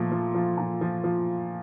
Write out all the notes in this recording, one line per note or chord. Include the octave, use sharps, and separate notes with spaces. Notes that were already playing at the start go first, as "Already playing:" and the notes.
Already playing: A#2 F3 A3
F3
F3
A#2
F3
F3